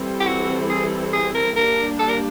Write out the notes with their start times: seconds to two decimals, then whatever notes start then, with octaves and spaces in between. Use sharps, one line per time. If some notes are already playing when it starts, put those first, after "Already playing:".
Already playing: E3 G3 C4 E4 A4
0.20 G4
0.27 F#4
0.70 G#4
1.13 G#4
1.35 A#4
1.56 G3 A#3 D4 A#4
1.99 A4
2.08 A#4